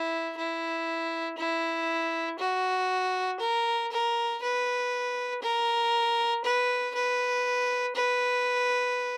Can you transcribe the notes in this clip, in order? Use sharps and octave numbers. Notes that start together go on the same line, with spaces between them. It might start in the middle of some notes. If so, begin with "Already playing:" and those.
Already playing: E4
E4
E4
F#4
A#4
A#4
B4
A#4
B4
B4
B4